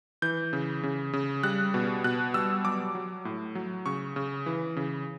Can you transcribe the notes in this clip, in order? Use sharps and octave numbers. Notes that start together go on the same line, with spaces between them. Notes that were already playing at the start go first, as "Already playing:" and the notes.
E3 G6
C#3
C#3
C#3
G3 F#6
B2
B2 F#6
G3 E6
F#3 D6
F#3
A2
F#3
C#3 C#6
C#3
E3
C#3